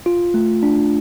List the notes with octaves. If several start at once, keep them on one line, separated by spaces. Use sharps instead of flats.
F4
A3
D4